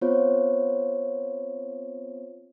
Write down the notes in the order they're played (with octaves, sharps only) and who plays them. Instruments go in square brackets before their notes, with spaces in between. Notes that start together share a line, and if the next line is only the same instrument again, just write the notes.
[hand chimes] B3 C4 F4 C5 C#5